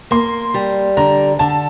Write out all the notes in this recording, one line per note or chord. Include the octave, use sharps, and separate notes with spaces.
A#3 C6
G3
D3 A#5
D3 A5